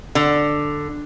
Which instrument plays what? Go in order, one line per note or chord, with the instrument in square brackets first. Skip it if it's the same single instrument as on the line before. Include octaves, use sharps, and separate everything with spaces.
[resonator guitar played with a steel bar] D3